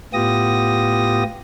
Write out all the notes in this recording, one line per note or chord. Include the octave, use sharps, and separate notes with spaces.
A2 B3 F4 G4 D#6 A#6